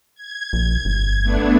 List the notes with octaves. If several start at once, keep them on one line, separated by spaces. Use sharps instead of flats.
G#6
A#1
G1
A3 B3 D4